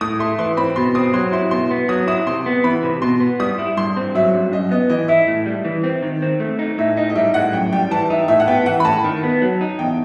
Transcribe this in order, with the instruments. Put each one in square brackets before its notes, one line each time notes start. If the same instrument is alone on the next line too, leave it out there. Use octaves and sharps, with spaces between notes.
[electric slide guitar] A2 [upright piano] D#6
[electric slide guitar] A3 [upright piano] C6
[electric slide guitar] E3 [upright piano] C6
[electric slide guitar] C4 [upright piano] B5
[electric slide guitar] B2 [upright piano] C6
[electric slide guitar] C4 [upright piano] D#6
[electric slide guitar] F#3 [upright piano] C6
[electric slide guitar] E4 [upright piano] C6
[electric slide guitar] B2 [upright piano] C6
[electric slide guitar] B3
[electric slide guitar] F#3 [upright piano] D#6
[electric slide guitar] E4 [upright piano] D#6
[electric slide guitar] C3 [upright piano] C6
[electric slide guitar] B3
[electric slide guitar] E3 [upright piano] B5
[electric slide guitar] C3
[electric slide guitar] B2 [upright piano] C6
[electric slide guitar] B3
[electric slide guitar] G3 [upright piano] D#6
[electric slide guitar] E4
[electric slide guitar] G2 [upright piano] C6
[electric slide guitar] C4
[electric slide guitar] F#3 [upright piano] E5
[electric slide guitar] G2
[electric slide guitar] F#2 [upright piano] D#5
[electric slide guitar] B3 [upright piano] D#5
[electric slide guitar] E3 [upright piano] D#5
[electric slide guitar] E4 [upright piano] E5
[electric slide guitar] A2
G3
E3
C4
D#3
C4
A3
D#4
[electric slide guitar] A2 [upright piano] E5
[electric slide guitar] D#4 [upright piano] D#5
[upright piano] D#5
[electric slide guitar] G3 [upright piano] E5
[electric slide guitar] A2 [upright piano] F#5
[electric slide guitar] F#2 [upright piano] G5
[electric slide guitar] G3 [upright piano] G5
[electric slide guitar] E3 [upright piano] A5
[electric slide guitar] D#4 [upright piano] E5
[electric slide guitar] A2 [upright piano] E5
[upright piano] F#5
[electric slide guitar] B3 [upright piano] G5
[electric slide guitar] E3 [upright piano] F#5
[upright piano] B5
[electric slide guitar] A2 [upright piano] A5
[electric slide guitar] D#3
B3
F#3
D#4
[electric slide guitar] E2 [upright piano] G5